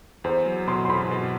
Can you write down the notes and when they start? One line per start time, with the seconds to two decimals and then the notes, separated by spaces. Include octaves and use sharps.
0.24 E2 C5
0.46 F#3
0.68 B2 C6
0.85 C6
0.89 E2 B5
1.11 B2